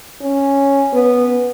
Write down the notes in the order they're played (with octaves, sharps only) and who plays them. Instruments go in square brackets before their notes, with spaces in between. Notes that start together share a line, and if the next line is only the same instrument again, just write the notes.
[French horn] C#4
B3